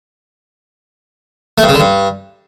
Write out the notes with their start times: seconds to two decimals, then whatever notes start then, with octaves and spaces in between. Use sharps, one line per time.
1.58 A3
1.63 G2
1.69 C#3
1.74 D3
1.80 G2